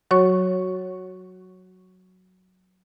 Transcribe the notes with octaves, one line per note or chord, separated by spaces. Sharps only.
F#3 F#4 C#5 C#6